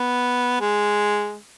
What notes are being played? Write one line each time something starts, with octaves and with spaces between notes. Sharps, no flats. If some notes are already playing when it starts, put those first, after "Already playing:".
Already playing: B3
G#3